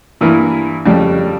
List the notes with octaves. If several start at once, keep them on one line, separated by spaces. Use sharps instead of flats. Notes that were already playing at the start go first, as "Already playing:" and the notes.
G2 E3 A#3 E4
F2 C#3 G3